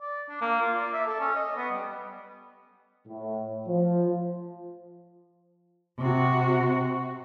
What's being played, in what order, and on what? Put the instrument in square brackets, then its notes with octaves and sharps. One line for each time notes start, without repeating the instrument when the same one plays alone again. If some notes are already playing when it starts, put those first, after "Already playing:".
[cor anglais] D5
D4
A#3
F4
D5
E5
A4
C#4
D#5
B3
G3
[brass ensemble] A2
F3
[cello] C3 F#4